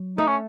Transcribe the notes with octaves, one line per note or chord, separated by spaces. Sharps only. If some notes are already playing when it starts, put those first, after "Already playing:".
Already playing: F#3
A3 D#4
C#4